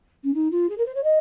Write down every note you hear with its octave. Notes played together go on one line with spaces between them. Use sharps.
C#4
D#4
F4
G#4
A#4
C5
C#5
D#5